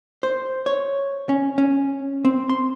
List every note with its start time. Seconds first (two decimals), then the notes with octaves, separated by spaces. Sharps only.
0.23 C5
0.66 C#5
1.29 C#4
1.58 C#4
2.25 C4
2.49 C6